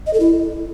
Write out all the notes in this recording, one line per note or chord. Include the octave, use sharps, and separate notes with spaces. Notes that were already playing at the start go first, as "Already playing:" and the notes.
D#5
A4
E4